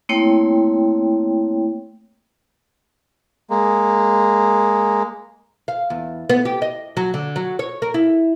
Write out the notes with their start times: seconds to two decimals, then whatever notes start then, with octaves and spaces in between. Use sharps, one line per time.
0.09 A3 A#3 C4 E4 C#5 G5
3.50 G#3 A#3
5.68 F5
5.90 E2
6.30 B3
6.45 G4
6.62 D#5
6.97 F#3
7.14 D3
7.36 F#3
7.59 C#5
7.82 A#4
7.94 E4